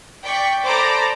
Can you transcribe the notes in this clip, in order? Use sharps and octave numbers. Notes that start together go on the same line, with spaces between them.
D5 G5 C#6 B6
A4 C5 D5 A#5 B5 D6